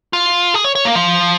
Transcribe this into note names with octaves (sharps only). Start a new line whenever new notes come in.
F4
G#4
C#5
C#5
A#3
F3